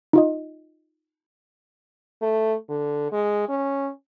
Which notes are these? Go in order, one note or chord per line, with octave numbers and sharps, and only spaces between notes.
D#4 F4 D#5
A3
D3
G#3
C#4